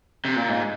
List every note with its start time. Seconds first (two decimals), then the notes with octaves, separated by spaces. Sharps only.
0.25 C3
0.36 A#2
0.49 G#2